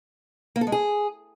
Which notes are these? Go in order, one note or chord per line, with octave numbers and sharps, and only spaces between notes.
A#3
A4
G#3
G#4